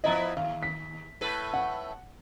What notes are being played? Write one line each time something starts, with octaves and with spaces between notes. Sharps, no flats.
F3 B3 E4 D#5 E5 A#5
D#2 F5
B6
A2 A4 B4
F#5